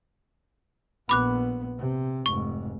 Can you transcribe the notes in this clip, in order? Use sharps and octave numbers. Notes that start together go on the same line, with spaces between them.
A#1 B3 B5 D6 F#6
C3
F1 G#2 C#6